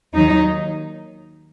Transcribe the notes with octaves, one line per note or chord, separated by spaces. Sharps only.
D#2 D#3 F#3 D#4